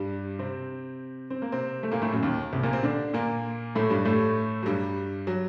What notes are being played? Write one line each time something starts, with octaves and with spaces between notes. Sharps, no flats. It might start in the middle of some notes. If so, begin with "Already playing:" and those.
Already playing: G2 G3
C3 C4
C4
A#3
C3 C4
A3
A#2 A#3
A2 A3
F#2 F#3
D#2 D#3
C2 C3
A#2 A#3
C3 C4
D3 D4
A#2 A#3
A2 A3
G2 G3
A2 A3
F#3
G2 G3
F#3